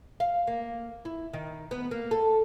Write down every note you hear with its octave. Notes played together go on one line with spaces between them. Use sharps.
F5
A#3
E4
D#3
B3
A#3
A4